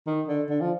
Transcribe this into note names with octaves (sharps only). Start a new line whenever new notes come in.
D#3
D3
D3
F3